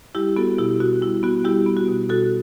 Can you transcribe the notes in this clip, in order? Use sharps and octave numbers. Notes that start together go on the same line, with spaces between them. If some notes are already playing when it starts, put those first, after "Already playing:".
G3 E4 G4
B3 F#4 A4
B2 E4 G4
B2 F#4
G3 E4
B3 F#4
G3 E4 G4
B3
F#4
B2
B2 F#4 A4